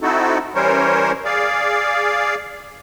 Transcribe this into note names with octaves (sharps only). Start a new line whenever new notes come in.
C4 D#4 E4 F#4 A4
E3 G3 C#4 A#4 C5 C#5
G#4 D5 F5